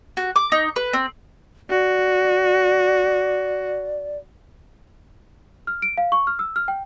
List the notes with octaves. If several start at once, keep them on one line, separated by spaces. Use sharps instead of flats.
F#4
D6
D#4
B4
C4
F#4 D5
F6
D7
F5
C#6
F6
E6
F6
G5